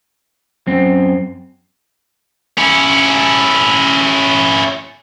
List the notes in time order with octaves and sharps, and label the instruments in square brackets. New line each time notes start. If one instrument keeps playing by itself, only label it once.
[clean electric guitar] F#2 C4
[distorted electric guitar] C#4 E4